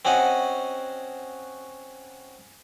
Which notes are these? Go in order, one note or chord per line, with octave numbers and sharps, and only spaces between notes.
C4 C#4 F#4 D#5 F#5